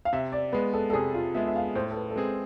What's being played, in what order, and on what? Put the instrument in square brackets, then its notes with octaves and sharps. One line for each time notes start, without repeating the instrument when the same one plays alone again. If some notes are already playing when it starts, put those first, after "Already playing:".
[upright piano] F5
[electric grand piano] C3 [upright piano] E5
[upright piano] D5
[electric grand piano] G#3 B3 [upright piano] B4
[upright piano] A4
A4
[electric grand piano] C3 [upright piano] G#4
[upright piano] F4
[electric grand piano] G#3 B3 [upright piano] E5
[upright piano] E5
F5
[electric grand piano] A2 [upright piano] C5
[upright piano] A4
B4
A4
[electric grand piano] G#3 C4 G#4 [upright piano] B4